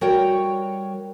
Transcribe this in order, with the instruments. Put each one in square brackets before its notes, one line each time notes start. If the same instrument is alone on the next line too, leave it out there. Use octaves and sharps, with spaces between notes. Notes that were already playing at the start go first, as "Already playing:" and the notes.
[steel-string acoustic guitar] G3 F#4 A#4 C#5 G5